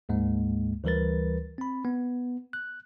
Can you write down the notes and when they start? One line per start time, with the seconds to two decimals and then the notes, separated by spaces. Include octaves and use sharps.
0.09 D2 G#2 G#3 A#3
0.84 D2 E3 G3 A#4 B4 A6
1.58 C4 B5
1.85 B3
2.53 F#6